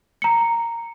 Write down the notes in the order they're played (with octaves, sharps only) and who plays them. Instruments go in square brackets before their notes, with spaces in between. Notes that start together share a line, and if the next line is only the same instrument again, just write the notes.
[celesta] A#5 C#7